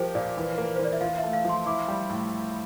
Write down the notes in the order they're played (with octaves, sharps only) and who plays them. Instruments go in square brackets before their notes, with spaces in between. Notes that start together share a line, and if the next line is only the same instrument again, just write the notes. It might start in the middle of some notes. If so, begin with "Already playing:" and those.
Already playing: [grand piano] F3 G4 [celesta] A#4 C5
[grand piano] A#2 [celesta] D5
[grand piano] E3
A#3
[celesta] C5
[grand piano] E3
[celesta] D5
E5
[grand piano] F4 [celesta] F5
[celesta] E5
[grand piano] A3
[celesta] F5
[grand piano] F3 [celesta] C6
[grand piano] E4 [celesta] D6
[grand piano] G3
A2